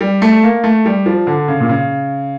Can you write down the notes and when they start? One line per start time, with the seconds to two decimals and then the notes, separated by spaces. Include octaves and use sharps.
0.01 G3
0.22 A3
0.43 A#3
0.64 A3
0.85 G3
1.06 F3
1.27 D3
1.48 C#3
1.60 A#2
1.69 C#3